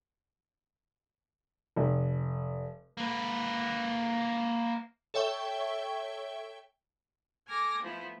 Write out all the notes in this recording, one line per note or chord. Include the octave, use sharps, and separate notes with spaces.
F1
A#3 B4
A4 C#5 E5 G5 C#6 G7
A4 G#5 D6 F6 A#6
F3 A3 B3 E4